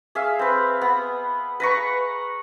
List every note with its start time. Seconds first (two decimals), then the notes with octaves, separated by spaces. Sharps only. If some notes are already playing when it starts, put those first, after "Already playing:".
0.15 G#4 E5 F5
0.39 C4 B4
0.81 B3
1.60 B4 A#5 C#6